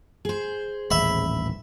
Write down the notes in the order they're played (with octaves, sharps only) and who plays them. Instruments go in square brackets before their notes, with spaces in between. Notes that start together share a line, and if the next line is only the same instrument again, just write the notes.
[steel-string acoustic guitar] G#4 C5
[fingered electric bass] D#1 A1 [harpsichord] E5 B5